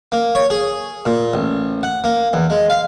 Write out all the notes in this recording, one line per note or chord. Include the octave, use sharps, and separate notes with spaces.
A#3
C#5
G#4
A#2
A1
F#5
A#3
E2
G#3
F5